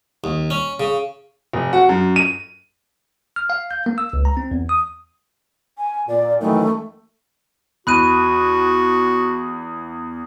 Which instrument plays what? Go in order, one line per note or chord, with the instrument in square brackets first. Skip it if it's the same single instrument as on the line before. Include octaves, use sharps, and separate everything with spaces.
[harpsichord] D#2
C#4
C#3
[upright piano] F1
F#4
F#2
D#7
[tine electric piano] F6
F5
G6
A#3
E6
C#2
A#5
C4
E2
D#6
[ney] G#5
[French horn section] A#2 [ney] D5
[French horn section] F#2 D#3 E3 [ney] A3
[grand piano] E2 [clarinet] F#4 [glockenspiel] B5 F#6 D#7